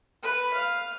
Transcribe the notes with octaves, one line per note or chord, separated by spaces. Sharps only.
B4
F5